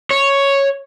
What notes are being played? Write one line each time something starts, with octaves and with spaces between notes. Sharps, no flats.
C#5